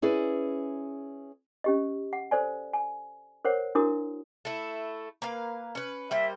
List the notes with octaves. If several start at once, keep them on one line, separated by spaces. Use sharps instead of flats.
C#4 E4 G#4 B4 D5
C#4 G4 D#5
F#5
A4 C5 D5 G#5
G#5
A#4 C5 C#5 F#5
D4 E4 F#4 A#4 D#6
A3 E4
A#3 B4 F5
C#4 B4
G3 A#3 C5 E5